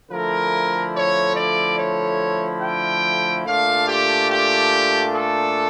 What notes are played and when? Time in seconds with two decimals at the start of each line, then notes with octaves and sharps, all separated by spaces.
0.10 D3 F3 A3 E4 A#4
0.94 C#5
1.36 D5
1.78 C#5
2.62 G5
3.46 A#2 A3 D4 F4 F5
3.88 G4
4.30 G4
5.14 A4